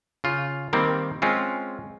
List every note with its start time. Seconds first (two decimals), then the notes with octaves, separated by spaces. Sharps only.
0.24 C#3 F4
0.73 D#3 G3 A#3 C4
1.22 G#3 C4 C#4 F4